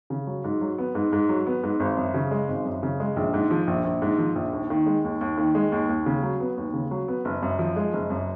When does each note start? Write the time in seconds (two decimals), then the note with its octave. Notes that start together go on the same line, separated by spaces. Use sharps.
0.10 C#3
0.27 F#3
0.44 G#2
0.61 F#3
0.78 B3
0.95 G#2
1.13 G#2
1.29 F#3
1.46 B3
1.63 G#2
1.80 G#1
1.97 F#2
2.14 C#3
2.31 G#3
2.48 G#1
2.65 F#2
2.83 C#3
3.00 G#3
3.16 A#1
3.34 G#2
3.51 F3
3.67 A#1
3.85 A#1
4.02 G#2
4.18 F3
4.36 A#1
4.53 D#2
4.70 D#3
4.86 G#3
5.04 D#2
5.21 D#2
5.38 D#3
5.55 G#3
5.72 D#2
5.89 D#2
6.06 C#3
6.23 F#3
6.40 B3
6.57 D#2
6.74 C#3
6.91 F#3
7.08 B3
7.25 F#1
7.43 F#2
7.59 F3
7.76 G#3
7.93 F#1
8.10 F#2